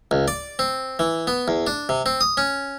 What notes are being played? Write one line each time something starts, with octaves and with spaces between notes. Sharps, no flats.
C#2
D5
C4
E3
B3
E2
D4
C3
C4
D#6
C#4